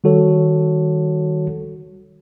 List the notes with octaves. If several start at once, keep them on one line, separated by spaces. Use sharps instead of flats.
D#3 G3 F#4 A4 C#5